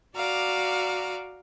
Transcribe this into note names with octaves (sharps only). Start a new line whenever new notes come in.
F#4 D5 F5 A#5 D6